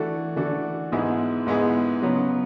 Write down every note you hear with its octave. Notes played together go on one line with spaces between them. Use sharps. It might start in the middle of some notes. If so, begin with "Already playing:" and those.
Already playing: E3 A3 D4 F#4 A4
E3 A3 D4 F#4 A4
G#2 G#3 B3 E4 G#4
G#2 G#3 B3 E4 G#4
C#3 F#3 B3